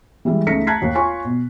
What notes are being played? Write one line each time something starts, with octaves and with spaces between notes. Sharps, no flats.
E3 G3 G#3 E4
C#2 A3 D#4 A#6 B6 C#7
A5 A#5 F#6 G#6 B6 C7
D#2
F4 C#5 G#5 C6 C#6
B2